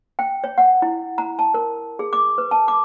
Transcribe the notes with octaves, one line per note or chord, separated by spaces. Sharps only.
G5
C#5
F#5
E4
A#5
A5
A#4
G#4
D6
B4
A5
D6